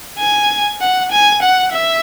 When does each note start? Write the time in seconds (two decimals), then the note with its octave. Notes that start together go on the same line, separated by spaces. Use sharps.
0.19 G#5
0.81 F#5
1.12 G#5
1.42 F#5
1.72 E5